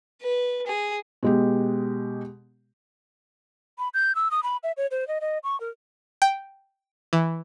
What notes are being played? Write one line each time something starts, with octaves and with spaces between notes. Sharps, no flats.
B4
G#4
B2 G#3 G4
B5
G6
E6
D#6
B5
E5
C#5
C5
D#5
D#5
C#6
A#4
G5
E3